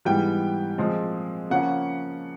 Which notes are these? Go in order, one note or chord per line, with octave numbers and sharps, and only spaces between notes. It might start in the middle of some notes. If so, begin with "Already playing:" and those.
G#2 E3 G3 B3 G5
A#2 F3 G#3 C4
C#3 F3 A#3 C#4 F#5